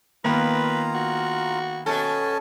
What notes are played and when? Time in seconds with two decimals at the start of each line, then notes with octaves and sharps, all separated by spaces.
0.24 D#3 A#3 B3 F4 B4 A#5
0.94 F#4
1.86 B2 C#4 A4 G#5 A5